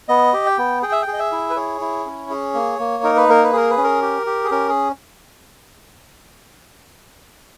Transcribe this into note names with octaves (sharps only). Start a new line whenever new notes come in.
B3 D#5
G4
G5
B3
G#4 G5
E5
G5
G#4
D#5
E5
E4
B4
G#4 C#5
E4
C#4
G#4
A#3
A#3
D#4 A#4
B4
A#3 A#4
B4
G#4 A#4
B4
C#4
A#4
G4
G4
G#4
C#4 A#4
G#4